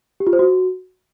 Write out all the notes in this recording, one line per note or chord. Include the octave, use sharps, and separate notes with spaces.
G4
F4
C5
F#4